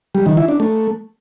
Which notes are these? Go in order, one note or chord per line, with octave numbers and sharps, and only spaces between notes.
G3
D#3
E4
D4
A3